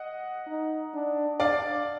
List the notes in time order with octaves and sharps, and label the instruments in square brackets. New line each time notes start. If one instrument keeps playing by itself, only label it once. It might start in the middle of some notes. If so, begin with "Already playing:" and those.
Already playing: [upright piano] D#5 F#5
[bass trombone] D#4
D4
[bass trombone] D4 [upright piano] D5 F5